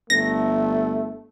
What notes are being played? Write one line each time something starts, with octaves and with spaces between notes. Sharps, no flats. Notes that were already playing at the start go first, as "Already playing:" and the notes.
G1 A3 A#6